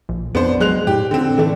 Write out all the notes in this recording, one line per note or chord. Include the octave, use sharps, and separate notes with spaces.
A#1
F2 B3 D4 C5
F#3 G#3 F#6 F7
A2 G4
D3 C4
E3 A3 D4